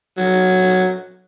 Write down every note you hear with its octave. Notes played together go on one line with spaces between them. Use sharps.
F#3